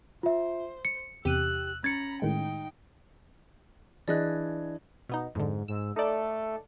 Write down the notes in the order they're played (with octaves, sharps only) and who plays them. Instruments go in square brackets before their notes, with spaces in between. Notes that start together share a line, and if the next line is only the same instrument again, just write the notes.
[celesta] F4 E5 [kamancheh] C5
[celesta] C#7
[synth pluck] E2 C3 D#7 [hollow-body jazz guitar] G4 G5 [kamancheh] E6 F#6
[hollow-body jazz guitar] C#4 [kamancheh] A#5 B5 [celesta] G#6 C#7 [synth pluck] A6
[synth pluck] A2 D#3 G#3 [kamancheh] D#4 G5
[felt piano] E3 D4 G#4 [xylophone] D5 D#5 F#6
[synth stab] B2 B3 D#4
[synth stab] F2 D3 [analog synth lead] G#2
[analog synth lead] G#2 [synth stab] E6
[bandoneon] A3 [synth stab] D#4 D5 [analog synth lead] A4